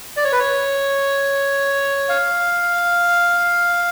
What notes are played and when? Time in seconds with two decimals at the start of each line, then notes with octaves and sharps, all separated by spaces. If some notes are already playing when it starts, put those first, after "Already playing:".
0.17 D5
0.25 C#5
0.32 B4
0.39 C#5
2.09 F5